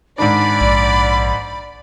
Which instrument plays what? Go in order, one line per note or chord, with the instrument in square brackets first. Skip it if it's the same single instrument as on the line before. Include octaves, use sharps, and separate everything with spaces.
[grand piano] G#2 D#3 D4 [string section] D5 [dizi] B5
[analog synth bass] A#1